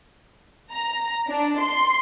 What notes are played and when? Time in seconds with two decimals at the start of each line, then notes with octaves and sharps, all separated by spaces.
0.72 A#5
1.28 D4
1.61 C6